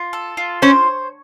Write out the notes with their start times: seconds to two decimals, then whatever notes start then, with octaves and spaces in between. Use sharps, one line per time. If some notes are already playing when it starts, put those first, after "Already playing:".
Already playing: F4
0.13 A4
0.37 F4
0.62 C#4 C5